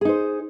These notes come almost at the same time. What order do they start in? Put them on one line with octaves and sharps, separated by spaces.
G#4 D#4 C5